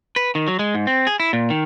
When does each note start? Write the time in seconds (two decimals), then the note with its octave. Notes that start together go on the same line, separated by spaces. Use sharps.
0.16 B4
0.35 D#3
0.48 F#3
0.59 G#3
0.75 G#2
0.87 C4
1.07 G#4
1.20 E4
1.33 A#2
1.50 D#3